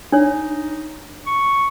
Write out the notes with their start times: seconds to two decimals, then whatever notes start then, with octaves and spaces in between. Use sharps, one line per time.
0.12 D4 D#4 C#5
1.26 C#6